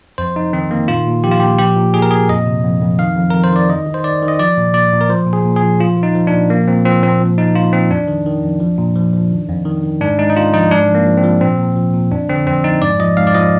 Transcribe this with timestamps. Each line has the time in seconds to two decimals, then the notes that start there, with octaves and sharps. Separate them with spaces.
0.18 F2 C5
0.35 F2 D#4
0.53 D#3 C4
0.71 D#3 A#3
0.88 A#2 F4
1.07 A#2
1.23 F3 G4
1.31 F4
1.40 A#2 G4
1.59 F3 G4
1.76 A#2
1.94 A#2 G#4
2.02 A#4
2.11 A#2 G#4
2.29 F2 D#5
2.46 C3
2.64 F2
2.81 F2
2.99 D#3 F5
3.16 F2
3.30 F2 A#4
3.44 C5
3.52 D#3 D5
3.69 D#3 D#5
3.86 D#3
3.94 C5
4.04 D#3 D5
4.22 D#3
4.28 D#5
4.39 F3 D5
4.58 A#2
4.74 A#2 D5
4.93 A#2
5.01 A#4
5.09 F3 C5
5.27 A#2
5.33 G#4
5.45 A#2
5.56 G#4
5.62 F3
5.80 F3 F4
5.97 F3
6.03 D#4
6.15 F3
6.27 D4
6.32 A#2
6.50 F3 A#3
6.68 A#2 C4
6.85 F3 C4
7.03 A#2 C4
7.20 F3
7.38 F3 D#4
7.55 A#2 F4
7.73 A#2 C4
7.90 F2 D4
8.07 D#3
8.26 D#3
8.44 F2
8.60 F3
8.78 A#2
8.96 F3
9.13 F3
9.31 D#3
9.49 F2
9.65 D#3
9.83 D#3
10.01 G#2 D4
10.19 G#2 D#4
10.30 D#4
10.37 G#2 F4
10.53 F3 D#4
10.71 G#2 D4
10.88 F3
10.95 A#3
11.06 F3
11.17 C4
11.24 F3
11.41 A#2 C4
11.59 A#2
11.76 F3
11.94 A#2
12.11 F2 D4
12.29 D3 C4
12.46 F2 C4
12.64 F2 D#4
12.81 G#2 D5
13.00 F3 D#5
13.17 G#2 F5
13.27 D5
13.34 F3 D#5